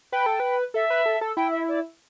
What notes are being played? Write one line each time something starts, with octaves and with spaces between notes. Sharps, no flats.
B4 G5
A4
B4
A4 E5
B4
A4
A4
E4 G5
E5
D5